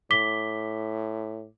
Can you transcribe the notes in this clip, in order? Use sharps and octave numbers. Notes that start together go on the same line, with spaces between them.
A2 D6 B6 G7